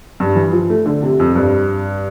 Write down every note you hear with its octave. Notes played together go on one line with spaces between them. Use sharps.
G2
E3
F3
A3
D3
C3
F2
G2